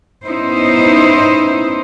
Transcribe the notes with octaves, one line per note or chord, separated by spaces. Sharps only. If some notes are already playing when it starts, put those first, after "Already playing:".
B3 C#4 D#4 E4 C5